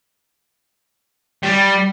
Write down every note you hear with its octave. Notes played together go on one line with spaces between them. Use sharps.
G3